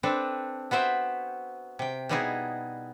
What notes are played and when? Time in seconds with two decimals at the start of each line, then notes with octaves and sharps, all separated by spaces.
0.03 C4 D4 A4 B4
0.71 B3 F#4 C5 E5 G5
1.79 C3 G5
2.09 B2 G3 B3 D#4 E4 G#4